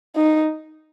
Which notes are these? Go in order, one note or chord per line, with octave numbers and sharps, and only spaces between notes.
D#4